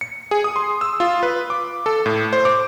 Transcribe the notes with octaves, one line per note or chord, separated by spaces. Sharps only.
C#7
G#4
D#6
C6
E6
F4
B4
D6
A4
A2
C5
D6